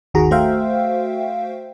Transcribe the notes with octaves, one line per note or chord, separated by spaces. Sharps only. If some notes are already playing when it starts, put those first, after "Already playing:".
G1 D#2 D#3 F#4 G#4 A#5
A3 F#4 C5 E5 F5 G5